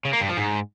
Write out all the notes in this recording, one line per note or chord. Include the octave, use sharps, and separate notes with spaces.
C#3
A#3
G2
F3
G#2